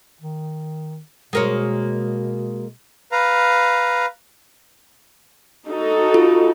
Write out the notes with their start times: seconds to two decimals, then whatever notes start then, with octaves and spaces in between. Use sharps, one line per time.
0.21 D#3
1.33 B2 G#3 A#3 C#5
3.12 B4 F5 A#5
5.67 D#4 F#4 A4
6.14 F4